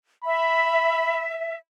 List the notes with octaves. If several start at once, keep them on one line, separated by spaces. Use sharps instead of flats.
E5 B5